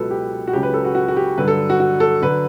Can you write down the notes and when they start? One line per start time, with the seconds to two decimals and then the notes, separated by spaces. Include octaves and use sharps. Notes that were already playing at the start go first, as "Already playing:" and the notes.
Already playing: C#2 B2 F#3 A4 B4
0.11 G4
0.47 F#4
0.53 C#2 C#3 F#3 G4
0.63 B4
0.73 A4
0.84 F#4
0.95 F#4
1.08 F#4
1.17 G4
1.38 G2 D3 F#3 B4
1.48 A4
1.70 F#4
1.80 F#4
2.00 A4
2.22 D3 F#3 B4